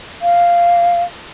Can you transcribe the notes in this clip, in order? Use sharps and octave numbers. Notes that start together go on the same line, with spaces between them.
F5